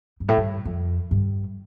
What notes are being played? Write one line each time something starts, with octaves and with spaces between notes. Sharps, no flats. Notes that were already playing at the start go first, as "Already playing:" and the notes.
G2
A2
G2
F2
G2